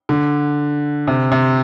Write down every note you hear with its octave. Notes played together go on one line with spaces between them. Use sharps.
D3
C3
C3